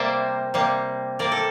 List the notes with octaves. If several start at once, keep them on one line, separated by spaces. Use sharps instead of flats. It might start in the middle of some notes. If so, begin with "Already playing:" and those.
Already playing: C3 G3 A#3 C5 D5 E5
C3 G3 A#3
C3 G3 A#3 A#4 D5
A4